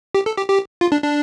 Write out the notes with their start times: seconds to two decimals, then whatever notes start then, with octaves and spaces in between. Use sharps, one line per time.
0.15 G4
0.26 A4
0.37 G4
0.48 G4
0.81 F4
0.92 D4
1.03 D4